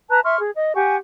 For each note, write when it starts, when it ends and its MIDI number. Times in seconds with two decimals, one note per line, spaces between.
0.10 0.20 71
0.10 0.20 81
0.10 0.20 82
0.10 0.20 90
0.24 0.38 76
0.24 0.38 84
0.24 0.38 85
0.24 0.38 89
0.41 0.50 68
0.56 0.73 75
0.75 0.96 67
0.75 0.96 78
0.75 0.96 80
0.75 0.96 85